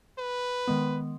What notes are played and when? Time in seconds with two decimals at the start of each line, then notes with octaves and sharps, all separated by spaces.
0.18 B4
0.68 D#3 G#3 B3